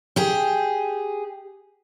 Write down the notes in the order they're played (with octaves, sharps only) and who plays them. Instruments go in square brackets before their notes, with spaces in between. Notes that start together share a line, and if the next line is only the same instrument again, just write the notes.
[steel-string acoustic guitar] G4 G#4